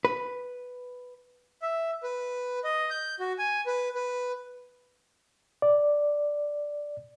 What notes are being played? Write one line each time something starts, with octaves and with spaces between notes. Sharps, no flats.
B4
E5
B4
D#5
G6
F#4
G#5
B4
B4
D5